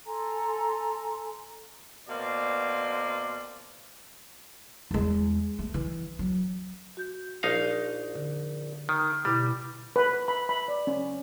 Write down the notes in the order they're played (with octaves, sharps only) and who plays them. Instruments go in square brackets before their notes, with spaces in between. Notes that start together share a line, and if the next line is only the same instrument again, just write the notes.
[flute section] A4 G#5 A#5 C6
[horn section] B2 A#3 C4 D5
[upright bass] E2 G#3
A3
E3
F#3
[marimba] F#4 G6
[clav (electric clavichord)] A#1 D#4 F5
[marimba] D3
[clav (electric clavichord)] D#3
[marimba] B2 E4 D6 [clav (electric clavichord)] G3
[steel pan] B4
B5
B5
D5
C#4